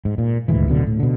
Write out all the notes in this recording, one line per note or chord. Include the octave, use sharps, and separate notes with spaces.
G#2
A#2
D#1 D2 G#2 E3
D1 B2 D3
A2
B2 D3